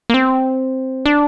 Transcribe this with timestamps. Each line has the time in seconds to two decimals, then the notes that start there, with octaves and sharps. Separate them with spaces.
0.10 A#3
0.14 C4
1.05 D4